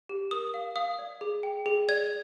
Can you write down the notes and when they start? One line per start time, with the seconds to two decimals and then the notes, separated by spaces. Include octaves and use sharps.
0.09 G4
0.31 A#4 D#6
0.54 F5
0.76 F5 D#6
0.99 D5
1.21 G#4
1.43 G5
1.66 G#4
1.89 D5 G#6